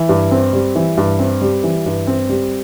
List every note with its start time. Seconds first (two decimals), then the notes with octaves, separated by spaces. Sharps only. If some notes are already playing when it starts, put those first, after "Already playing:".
Already playing: E3
0.09 G2
0.31 C4
0.53 G3
0.75 E3
0.97 G2
1.19 C4
1.42 G3
1.64 E3
1.86 G2
2.07 C4
2.29 G3